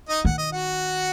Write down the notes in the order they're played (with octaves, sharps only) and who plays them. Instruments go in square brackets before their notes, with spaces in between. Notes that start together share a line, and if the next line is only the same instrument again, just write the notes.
[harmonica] D#4 D#5
[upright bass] D#3 [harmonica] F#5
[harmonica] D#5
F#4 F#5